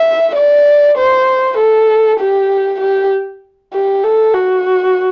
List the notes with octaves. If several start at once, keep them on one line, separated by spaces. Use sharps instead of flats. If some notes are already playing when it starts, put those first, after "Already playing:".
Already playing: E5
D5
C5
A4
G4
G4
G4
A4
F#4